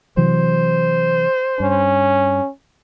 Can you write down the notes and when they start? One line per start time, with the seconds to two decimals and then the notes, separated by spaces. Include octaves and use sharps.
0.17 C3 E3 F#3 C5
1.60 G2 C#4